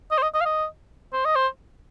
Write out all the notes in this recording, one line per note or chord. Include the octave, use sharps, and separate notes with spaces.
D#5
C5
D#5
D#5
F5
D#5
C5
D#5
C5